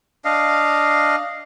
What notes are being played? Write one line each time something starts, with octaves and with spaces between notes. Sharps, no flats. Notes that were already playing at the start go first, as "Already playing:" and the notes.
D4 D#5 F5